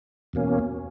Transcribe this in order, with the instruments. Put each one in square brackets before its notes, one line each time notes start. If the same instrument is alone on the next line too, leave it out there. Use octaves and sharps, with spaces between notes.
[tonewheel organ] E2 B2 A#3 C#4